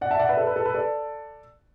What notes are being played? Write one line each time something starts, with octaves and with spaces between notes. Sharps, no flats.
D5 F#5
E5 A5
D5 F#5
B4 E5
A4 D5
B4
A4
B4
A4 D5